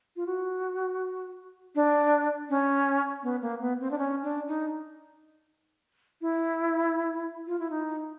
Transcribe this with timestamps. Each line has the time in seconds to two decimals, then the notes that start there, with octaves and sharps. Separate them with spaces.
0.16 F4
0.27 F#4
1.75 D4
2.50 C#4
3.23 B3
3.42 A#3
3.60 B3
3.80 C4
3.91 D4
3.98 C#4
4.23 D4
4.48 D#4
6.21 E4
7.47 F4
7.59 E4
7.70 D#4